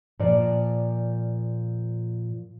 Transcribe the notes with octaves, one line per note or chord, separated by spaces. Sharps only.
A#2 F3 D5